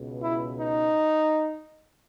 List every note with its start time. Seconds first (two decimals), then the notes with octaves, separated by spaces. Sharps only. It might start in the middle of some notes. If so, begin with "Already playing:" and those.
Already playing: C#2 B2
0.23 E4
0.61 D#4